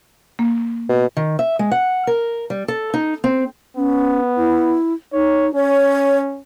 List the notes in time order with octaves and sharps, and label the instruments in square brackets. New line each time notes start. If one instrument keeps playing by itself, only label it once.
[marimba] A#3
[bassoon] B2
[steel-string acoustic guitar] D#3
E5
G#3
F#5
A#4
G3
A4
D#4
C4
[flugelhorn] B3 [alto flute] C#4
[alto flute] E4
[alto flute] D#4 [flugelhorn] C#5
[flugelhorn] C#4 [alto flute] C#5